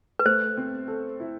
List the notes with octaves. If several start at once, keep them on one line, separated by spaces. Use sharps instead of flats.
B4
A3 C5
C4
A4
E4